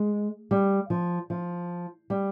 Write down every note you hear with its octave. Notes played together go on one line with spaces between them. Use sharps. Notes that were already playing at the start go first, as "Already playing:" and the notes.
Already playing: G#3
G3
F3
F3
G3